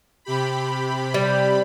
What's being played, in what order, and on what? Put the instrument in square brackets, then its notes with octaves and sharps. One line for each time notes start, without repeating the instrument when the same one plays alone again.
[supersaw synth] C3 G4 B5
[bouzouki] G3